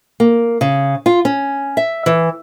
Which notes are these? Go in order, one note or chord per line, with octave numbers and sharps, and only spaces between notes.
A#3
C#3
F4
C#4
E5
E3